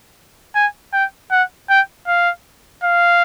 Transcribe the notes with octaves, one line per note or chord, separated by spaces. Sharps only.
G#5
G5
F#5
G5
F5
F5